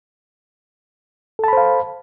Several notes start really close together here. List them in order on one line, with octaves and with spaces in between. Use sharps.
A4 A5 B5 C5 F5